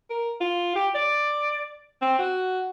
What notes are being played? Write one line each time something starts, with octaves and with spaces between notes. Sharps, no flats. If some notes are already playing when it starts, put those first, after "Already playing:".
A#4
F4
G4
D5
C4
F#4